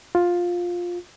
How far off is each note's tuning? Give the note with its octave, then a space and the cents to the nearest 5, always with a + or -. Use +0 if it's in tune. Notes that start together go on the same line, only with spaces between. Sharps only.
F4 +10